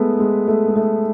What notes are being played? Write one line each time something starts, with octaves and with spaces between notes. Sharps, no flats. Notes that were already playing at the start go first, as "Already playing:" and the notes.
Already playing: G#3 A3 B3
G#3
A3
G#3
A3